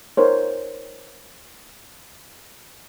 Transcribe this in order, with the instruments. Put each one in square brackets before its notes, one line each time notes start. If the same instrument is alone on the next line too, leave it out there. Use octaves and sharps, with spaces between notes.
[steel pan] D#4 A#4 C5 C#5